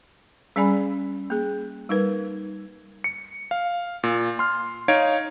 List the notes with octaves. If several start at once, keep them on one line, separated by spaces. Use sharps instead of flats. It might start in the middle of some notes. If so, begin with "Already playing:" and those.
G3 C#4 G#4 D5 G#5 B5
A#3 G#4
G3 D#4 A#4 B4
C#7
F5
A#2
C6 F6
D#4 C#5 F5 G#6 D7